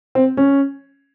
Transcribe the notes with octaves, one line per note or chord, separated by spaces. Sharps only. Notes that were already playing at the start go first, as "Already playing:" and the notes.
C4
C#4